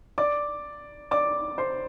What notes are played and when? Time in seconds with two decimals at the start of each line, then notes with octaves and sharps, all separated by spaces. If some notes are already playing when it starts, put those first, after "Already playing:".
0.18 D5 D6
1.11 D5 D6
1.58 C5 C6